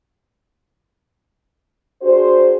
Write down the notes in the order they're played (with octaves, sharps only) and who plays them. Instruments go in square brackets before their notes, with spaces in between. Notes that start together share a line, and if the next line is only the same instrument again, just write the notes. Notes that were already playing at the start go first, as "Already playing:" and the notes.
[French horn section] D4 F#4 G#4 C5